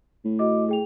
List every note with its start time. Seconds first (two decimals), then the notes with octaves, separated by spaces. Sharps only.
0.25 A2
0.39 F#4 D#5 D6
0.69 G#4 G5 F7